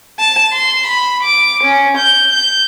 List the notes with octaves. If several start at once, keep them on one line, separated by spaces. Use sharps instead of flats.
A5
C6
B5
D6
C#4
G6
G6